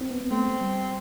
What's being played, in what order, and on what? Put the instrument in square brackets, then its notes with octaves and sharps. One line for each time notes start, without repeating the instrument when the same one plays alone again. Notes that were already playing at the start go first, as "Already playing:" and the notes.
[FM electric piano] C4
B3
B3
[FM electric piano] A3 [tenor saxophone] C4
[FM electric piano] A3
G3